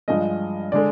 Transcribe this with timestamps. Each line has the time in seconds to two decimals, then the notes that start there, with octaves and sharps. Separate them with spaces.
0.08 G2 F3 G#3 D#5
0.72 D3 G#3 D5